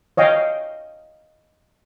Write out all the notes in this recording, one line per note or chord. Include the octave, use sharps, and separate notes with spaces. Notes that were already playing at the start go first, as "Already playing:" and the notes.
C#5 D#5 F5 G5